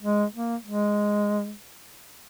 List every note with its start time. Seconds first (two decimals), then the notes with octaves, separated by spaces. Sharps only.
0.02 G#3
0.34 A#3
0.65 G#3